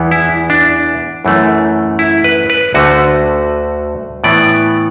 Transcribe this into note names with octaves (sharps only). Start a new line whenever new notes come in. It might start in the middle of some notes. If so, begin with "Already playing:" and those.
Already playing: E2 E3 B3
E4
D4
F#2 E3 A3
E4
B4
B4
D2 D3 A3 F#4
A2 E3 B3 D5